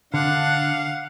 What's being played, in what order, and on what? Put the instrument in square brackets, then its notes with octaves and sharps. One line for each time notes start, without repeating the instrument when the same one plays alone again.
[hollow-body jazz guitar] D3 [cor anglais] D4 [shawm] F5 [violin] F#5